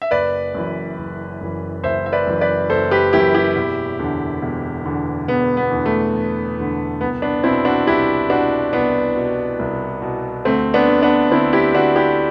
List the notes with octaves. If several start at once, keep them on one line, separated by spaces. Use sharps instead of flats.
E5
F#1 B4 D5
F#2 E3
F#1
F#2 E3
F#1 C5 E5
E5
B4 D5
F#2 E3
B4 D5
F#1 A4 C5
G4 B4
F#2 E3 E4 G4
E4 G4
E1
E2 D3
E1
E2 D3
E1 B3
B3
E2 D3
A3
E1
E2 D3
C2 B3
B3 D4
B2 C4 E4
D4 F#4
C2 E4 G4
B2 D4 F#4
C2 B3 D4
B2
C2
B2
D2 A3 C4
B3 D4
D3
B3 D4
D2 C4 E4
E4 G4
D3 D4 F#4
E4 G4